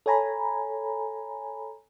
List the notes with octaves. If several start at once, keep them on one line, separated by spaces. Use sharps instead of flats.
A4 C#5 G#5 A#5 B5